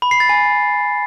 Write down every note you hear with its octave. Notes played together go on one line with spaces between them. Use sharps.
B5
C7
A6
G#5